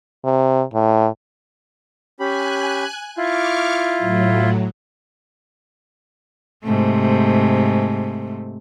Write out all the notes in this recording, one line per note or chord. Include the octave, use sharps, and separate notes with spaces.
C3
A2
C#4 G4 G#5 B5 F#6
E4 F4 C#6 D6 F6
A2 F#3
G#2 C3 A3